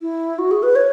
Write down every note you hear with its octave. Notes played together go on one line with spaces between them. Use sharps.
E4
F#4
G#4
B4
C#5